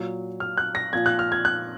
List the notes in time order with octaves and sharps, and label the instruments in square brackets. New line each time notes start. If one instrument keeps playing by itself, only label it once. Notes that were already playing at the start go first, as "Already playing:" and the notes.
Already playing: [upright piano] A#2 F#3
F6
F#6
A#6
A#2 F3 G#6
F#6
F6
G#6
F#6